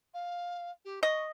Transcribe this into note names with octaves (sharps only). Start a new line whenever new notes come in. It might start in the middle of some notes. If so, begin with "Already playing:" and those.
F5
G4
D#5 C#6